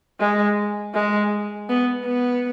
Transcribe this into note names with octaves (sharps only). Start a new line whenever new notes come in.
G#3
G#3
B3
B3